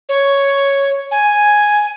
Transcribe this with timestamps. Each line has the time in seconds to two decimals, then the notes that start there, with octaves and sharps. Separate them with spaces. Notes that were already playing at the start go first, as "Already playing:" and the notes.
0.09 C#5
1.11 G#5